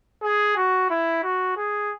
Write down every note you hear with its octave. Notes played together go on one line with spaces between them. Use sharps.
G#4
F#4
E4
F#4
G#4